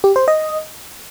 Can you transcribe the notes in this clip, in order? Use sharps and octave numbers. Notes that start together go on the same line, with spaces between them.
G4
C5
D#5